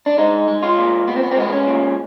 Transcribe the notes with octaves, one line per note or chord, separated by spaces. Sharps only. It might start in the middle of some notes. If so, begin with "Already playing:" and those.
D4
G#3 D#4
G#3
F4
A#2
A#2 B3
C4
B3
C4
G#3 B3
C#4
A#2